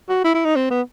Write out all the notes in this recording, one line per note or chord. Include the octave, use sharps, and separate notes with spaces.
F#4
E4
E4
D#4
C4
B3